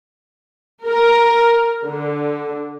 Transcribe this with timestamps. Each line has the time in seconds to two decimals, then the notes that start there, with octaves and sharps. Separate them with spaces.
0.86 A#4
1.87 D3